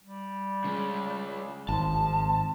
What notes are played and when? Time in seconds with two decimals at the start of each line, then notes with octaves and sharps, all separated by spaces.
0.03 G3
0.64 C#3 G#3
1.69 G#1 F3 A5